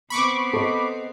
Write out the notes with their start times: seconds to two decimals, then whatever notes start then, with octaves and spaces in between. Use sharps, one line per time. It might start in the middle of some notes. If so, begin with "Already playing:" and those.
0.10 B3 C4 B5 C#6 D6
0.53 A4 D#5